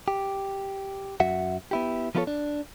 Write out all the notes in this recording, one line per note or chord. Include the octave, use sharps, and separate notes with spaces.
G4
F#2 F#4 E5 F#5
B3 E4 G4
F3 B3 E4 F4 A4 C#5
D4